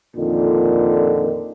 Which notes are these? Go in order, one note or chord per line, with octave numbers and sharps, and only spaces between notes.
F2 A#2 D3 D#3